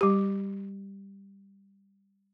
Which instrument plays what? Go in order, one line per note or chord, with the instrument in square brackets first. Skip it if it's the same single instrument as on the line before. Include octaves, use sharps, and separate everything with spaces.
[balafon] G3 G4